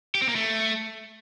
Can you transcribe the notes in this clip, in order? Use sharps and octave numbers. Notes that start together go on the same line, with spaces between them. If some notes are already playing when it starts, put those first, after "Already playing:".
G4
C4
A#3
A3